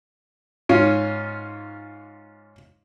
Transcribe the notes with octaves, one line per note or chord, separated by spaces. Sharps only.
G#2 C#4 F4